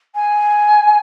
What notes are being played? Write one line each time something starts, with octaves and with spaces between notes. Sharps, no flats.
G#5